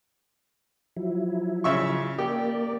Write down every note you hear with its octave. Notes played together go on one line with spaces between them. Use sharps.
F3 F#3 E4
C#3 E5 C#6
A#3 G4 D5